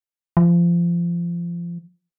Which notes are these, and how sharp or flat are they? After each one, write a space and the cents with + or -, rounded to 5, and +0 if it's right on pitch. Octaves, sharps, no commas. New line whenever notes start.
F3 -25